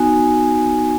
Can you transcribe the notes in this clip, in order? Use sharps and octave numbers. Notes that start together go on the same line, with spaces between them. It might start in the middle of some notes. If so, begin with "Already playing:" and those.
Already playing: B3 D#4 F#4 G#5